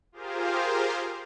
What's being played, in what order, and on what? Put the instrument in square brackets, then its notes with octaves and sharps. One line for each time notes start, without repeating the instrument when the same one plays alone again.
[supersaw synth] F4 G4 G#4 A#4 C5 F5